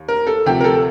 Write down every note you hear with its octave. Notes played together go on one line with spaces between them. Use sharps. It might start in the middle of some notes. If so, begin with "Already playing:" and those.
Already playing: D#2
A#4
A4
D2 C3 F3 G4
A#4
A4